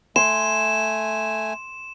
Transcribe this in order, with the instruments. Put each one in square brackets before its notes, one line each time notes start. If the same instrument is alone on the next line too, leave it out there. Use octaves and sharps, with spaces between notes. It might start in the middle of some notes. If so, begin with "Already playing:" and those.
[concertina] A3 G#5 [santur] C6 [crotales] E7